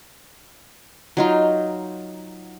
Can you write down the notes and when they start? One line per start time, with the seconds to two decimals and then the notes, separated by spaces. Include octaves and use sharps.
1.17 F#3 D#4 F4